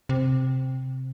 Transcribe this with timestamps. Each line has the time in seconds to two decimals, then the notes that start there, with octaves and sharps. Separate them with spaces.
0.09 C3